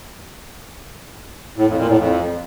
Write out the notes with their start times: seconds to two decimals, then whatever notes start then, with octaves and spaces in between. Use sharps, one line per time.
1.57 A2
1.67 F2
1.78 A#2
1.88 A2
1.99 F2